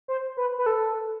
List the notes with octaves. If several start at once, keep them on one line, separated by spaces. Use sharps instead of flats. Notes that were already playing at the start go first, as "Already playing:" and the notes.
C5
B4
B4
A4